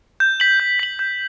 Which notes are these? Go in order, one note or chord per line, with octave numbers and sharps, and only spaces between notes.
G6
B6 F#7
G6
B6 F#7
G6